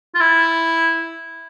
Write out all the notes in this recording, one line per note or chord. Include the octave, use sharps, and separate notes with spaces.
F4
E4